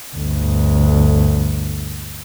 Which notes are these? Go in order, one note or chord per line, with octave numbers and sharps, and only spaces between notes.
G1 D2